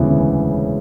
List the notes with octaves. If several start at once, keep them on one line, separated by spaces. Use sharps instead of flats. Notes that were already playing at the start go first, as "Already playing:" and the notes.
Already playing: E1 D2 C#3 E3 B3